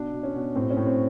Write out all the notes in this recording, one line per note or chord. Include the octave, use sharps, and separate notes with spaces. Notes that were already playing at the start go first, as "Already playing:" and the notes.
Already playing: B2 D4
B2
C#4
B2
A2 C4
C#4
A2
C4